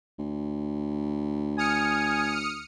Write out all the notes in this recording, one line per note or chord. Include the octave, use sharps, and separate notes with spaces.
D2
G#5 D#6 F6 C#7